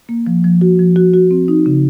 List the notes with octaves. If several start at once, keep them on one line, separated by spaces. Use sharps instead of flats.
A#3
F3
F3
F#4
F3
F#4
F#4
C4
D#4
C#3